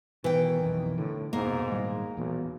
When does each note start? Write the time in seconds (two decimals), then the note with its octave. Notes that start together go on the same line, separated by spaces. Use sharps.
0.24 B2 D#3 E3 G5
0.62 B1 F2 B2
0.98 A2 D3
1.33 F1 G#2 B2 A#3
1.71 G#1 A#2 G3
2.17 B1 E2 A#2